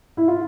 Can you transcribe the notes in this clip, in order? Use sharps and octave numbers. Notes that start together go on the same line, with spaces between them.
E4
F4